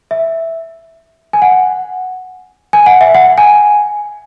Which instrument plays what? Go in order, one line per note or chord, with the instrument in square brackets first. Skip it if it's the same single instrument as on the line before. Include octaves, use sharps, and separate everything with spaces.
[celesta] E5
G#5
F#5
G#5
F#5
E5
F#5
G#5